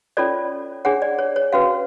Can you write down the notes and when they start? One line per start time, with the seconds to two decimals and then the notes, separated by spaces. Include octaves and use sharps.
0.17 C#4 F4 A4 C#5 D5
0.85 D4 G#4 C#5 F#5
1.02 D5
1.19 C#5
1.36 C#5
1.53 C#4 F#4 B4 F5